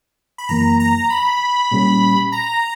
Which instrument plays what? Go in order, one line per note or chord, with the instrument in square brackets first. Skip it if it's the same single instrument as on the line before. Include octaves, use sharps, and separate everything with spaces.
[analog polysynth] B5
[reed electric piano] F#2 E3 A#3 [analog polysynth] A#5
[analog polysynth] A#5
B5
[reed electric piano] A#2 G3 C#4 G4
[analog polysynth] A#5